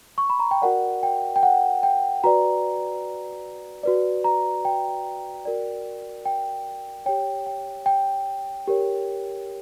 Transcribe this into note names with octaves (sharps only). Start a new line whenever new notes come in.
C#6
B5
A#5
G5
F#4 A#4 D5 F#5
G5
G5
F#5
G5
F#4 B4 D5 A#5
F#4 B4 D5
A#5
G5
F#4 A#4 D5
G5
G4 C#5 G5
G5
G5
G4 A#4 C#5